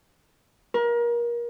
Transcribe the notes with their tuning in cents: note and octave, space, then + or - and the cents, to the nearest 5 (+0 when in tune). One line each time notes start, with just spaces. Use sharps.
A#4 +30